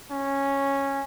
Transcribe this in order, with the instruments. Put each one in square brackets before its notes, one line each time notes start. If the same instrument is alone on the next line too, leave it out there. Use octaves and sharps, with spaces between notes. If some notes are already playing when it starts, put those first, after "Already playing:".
[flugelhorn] C#4